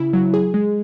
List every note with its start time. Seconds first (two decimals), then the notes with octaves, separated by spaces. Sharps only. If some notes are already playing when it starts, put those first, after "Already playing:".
Already playing: C#3 E4
0.13 F#3
0.34 G#4
0.54 G#3